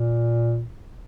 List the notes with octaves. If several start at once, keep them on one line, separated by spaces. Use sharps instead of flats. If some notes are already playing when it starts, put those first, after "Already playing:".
Already playing: A#2